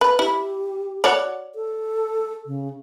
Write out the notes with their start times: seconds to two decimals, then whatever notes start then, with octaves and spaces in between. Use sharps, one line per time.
0.01 B4
0.19 E4 G4
1.04 F#4 C#5 D5
1.55 A4
2.46 C#3